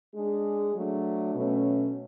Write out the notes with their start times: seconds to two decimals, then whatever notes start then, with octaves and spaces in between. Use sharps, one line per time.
0.14 G#3 D4 G#4
0.74 F#3 A3 D4
1.35 B2 F#3 A3 C#4